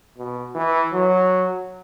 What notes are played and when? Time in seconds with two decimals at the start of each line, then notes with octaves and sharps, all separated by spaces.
0.18 B2
0.55 E3
0.93 F#3